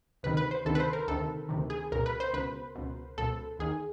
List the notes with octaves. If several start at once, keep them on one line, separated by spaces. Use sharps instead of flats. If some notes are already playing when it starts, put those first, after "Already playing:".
D2 C3 D#3 B4
B4
C5
D2 C3 D#3 A4
B4
C5
A#4
D2 C3 D#3 A4
D2 C3 D#3
G#4
C#2 B2 A#4
B4
C5
C#2 B2 B4
C#2 B2
C#2 B2 A4
D#2 D#3 G#4